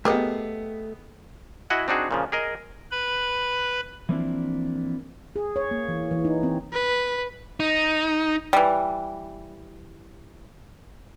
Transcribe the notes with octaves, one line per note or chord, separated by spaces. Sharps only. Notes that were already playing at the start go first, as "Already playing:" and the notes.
A3 B3 G4 G#4 A#4 D#5
E4 F#4 D#5 F#5 G#5
C4 D4 D#4 F#4 G#4
A#2 C#3 F3
G#4 A#4 D#5
B4 B5
E3 F3 A#3 C4 D4 E4
G#4
C#5
A#3
E3
E3
D#4
C4
B4
D#4
E3 G3